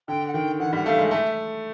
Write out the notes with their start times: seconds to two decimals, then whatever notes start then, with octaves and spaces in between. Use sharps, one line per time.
0.08 D3 G5
0.28 F#5
0.34 D#3 G5
0.60 E3 F#5
0.73 G3 F#5
0.86 A3 F5
0.98 G#3
1.11 A3 E5